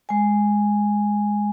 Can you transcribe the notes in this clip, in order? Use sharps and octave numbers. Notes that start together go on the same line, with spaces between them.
G#3 G#5